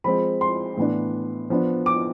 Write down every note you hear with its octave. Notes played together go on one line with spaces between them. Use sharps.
F3 G#3 C4 B5
C6
A2 E3 B3 D4
F3 B3 D4
D6